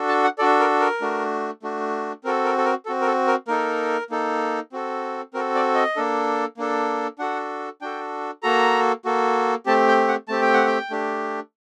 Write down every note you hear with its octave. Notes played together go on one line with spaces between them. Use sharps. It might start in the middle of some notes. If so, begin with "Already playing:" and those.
Already playing: D4 F#4 A4
A5
F#5
D4 F#4 A4 D5
A#4
A#4
A3 D4 F#4
A3 D4 F#4
C4 F#4 A4 A#4
A#4
A4
A#4
C4 F#4 A4
A#4
A4
A#4
A#3 D#4 A4 A#4
A#3 D#4 A4
C4 F#4 A4
C4 F#4 A4 A#4
D5
D#5
A#3 D4 A4
A#3 D4 A4
D4 F#4 A4 F#5
D4 F#4 A4 G5
A#3 F#4 A4 A#5
A#3 F#4 A4
A3 C4 G4 A5
G5
F#5
A3 C4 G4 A5
G5
F#5
G5
A3 D4 G4